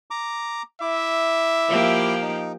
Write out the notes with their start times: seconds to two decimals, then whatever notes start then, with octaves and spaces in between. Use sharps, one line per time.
0.11 A#5 D6
0.81 E4 E5 D6
1.68 F3 A#3 G4
2.22 D#4